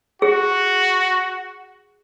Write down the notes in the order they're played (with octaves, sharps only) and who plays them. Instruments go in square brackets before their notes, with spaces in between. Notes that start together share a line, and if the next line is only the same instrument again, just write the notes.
[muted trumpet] F#4 [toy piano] G#4